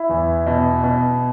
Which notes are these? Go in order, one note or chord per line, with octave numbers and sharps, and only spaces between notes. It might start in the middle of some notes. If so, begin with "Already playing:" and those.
Already playing: E4
E2
B2
B2